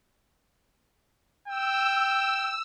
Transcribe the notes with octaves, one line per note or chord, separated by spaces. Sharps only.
G5 E6